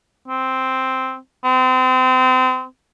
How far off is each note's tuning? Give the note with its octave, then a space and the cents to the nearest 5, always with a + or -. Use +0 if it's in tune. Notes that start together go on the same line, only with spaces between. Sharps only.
C4 +0
C4 -30